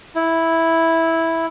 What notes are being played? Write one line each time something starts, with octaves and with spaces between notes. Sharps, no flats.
E4